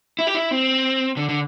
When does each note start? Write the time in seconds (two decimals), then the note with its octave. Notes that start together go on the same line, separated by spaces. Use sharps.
0.19 E4
0.27 G4
0.34 E4
0.51 C4
1.17 D3
1.29 D3